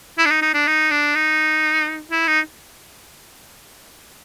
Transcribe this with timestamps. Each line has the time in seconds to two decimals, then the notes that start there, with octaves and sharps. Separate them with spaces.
0.18 E4
0.25 D4
0.30 D#4
0.42 D#4
0.54 D4
0.67 D#4
0.91 D4
1.15 D#4
2.11 E4
2.27 D#4